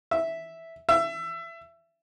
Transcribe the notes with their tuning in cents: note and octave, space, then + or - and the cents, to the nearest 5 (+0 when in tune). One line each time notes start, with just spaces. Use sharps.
E5 -5
E5 +20